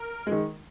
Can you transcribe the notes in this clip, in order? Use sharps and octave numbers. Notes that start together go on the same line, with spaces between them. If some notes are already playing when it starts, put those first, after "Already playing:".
Already playing: A#4
D#3 G#3